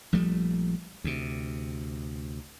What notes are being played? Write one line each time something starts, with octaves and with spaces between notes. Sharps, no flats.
A#1 F3 G3 A3
D2 C3